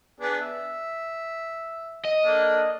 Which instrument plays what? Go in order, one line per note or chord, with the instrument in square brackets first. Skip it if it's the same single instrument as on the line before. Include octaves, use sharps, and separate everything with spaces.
[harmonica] B3 D4 G#4
E5
[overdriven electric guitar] D#5
[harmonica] A#3 D4 A4